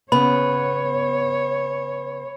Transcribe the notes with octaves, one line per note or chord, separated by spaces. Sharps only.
C#3 B3 C#5 B5